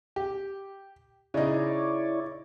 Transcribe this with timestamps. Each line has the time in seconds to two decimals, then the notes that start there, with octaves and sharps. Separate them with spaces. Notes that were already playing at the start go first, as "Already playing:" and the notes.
0.16 G4
1.34 C#3 D#4 E4 C#5 D5